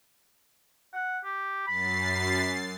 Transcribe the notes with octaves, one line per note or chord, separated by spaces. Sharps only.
F#5
G4
F#2 B5 A6 C7
B5